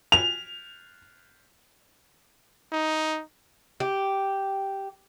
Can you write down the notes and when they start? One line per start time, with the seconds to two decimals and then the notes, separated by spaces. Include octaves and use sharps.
0.12 F7
2.73 D#4
3.80 G4